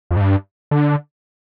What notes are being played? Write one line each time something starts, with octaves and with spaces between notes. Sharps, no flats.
F2
G#2
G2
D3